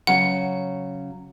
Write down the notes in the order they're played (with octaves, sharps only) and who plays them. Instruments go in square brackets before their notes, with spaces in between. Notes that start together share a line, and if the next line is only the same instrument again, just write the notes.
[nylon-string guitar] C#3 F#3 C#4 [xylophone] F#5